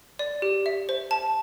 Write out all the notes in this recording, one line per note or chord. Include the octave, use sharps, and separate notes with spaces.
D5
G4
E5
C5
A5